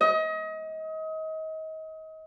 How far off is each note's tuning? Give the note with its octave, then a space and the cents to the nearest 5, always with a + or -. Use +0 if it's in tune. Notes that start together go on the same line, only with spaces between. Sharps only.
D#5 +30